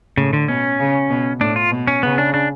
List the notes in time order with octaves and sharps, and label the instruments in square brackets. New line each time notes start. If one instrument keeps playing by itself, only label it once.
[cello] A2 [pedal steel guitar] C#3
[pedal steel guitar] D3
[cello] B2 [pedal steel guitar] C#4
[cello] C#3
B2
[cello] A2 [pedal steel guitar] D4
[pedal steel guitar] F4
[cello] B2
[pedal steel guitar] C#4
[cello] C#3 [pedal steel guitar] B3
[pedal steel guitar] D4
D4